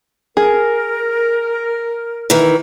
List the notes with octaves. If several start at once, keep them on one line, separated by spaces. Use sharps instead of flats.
G#4 A#4
D#3 E3